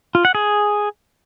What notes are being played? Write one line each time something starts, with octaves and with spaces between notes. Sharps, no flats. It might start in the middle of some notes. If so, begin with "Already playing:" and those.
F4
F#5
G#4